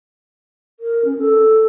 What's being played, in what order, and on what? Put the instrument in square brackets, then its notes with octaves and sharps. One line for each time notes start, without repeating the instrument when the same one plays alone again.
[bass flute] A#4
C#4
A4